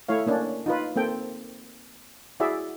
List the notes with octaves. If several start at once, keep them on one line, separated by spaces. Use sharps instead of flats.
A3 E4 C#5 F5
A#3 C#4 D4
D#4 F4 B4
A#3 C4 A4 G5
E4 F#4 G#4 D5 E5